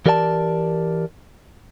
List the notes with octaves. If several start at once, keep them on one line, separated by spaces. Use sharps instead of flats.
E3 G4 A#4 D5 G5 A5